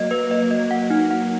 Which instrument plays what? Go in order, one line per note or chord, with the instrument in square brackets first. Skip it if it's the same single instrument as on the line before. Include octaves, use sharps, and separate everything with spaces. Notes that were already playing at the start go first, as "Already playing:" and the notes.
Already playing: [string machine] F#3 A#3 [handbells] D#5
[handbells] B4
D#5
D#5
F#5
D#4
F#5